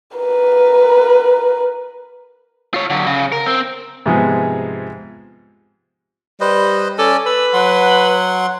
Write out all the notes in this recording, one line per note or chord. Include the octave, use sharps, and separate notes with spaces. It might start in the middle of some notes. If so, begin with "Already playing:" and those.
A#4 B4
F4 C#5
D3 F#3
C#3
A#4
C4
G#2 C3 F3 G#3 B3 G#4
G3 B4 C5 D#5
C#4 A4 D5 G#5
B4 E6
F#3 F#5 C6